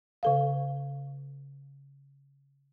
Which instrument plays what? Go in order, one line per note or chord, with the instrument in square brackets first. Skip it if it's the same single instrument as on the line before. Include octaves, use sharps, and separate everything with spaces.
[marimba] C#3 A4 F5